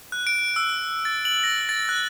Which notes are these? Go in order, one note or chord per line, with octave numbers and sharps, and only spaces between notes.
F#6
D7
E6
A6
F#7
A#6
A6
F#6